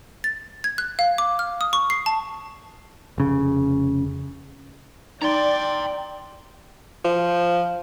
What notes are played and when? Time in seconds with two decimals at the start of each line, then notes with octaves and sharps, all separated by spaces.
0.24 A6
0.64 G#6
0.78 F#6
0.99 F5
1.18 D6
1.39 F6
1.61 D#6
1.73 C#6
1.90 C7
2.06 A5
3.18 F1 C#3
5.22 D#4 D5 G5 A#5 C6
7.05 F3